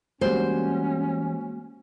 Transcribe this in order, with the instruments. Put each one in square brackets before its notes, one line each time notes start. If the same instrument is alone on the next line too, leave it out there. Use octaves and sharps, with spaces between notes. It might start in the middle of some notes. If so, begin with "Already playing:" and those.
[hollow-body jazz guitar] E2 G2 G3 [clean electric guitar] G#3 A#3 F#4 [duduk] C#4 [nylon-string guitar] C5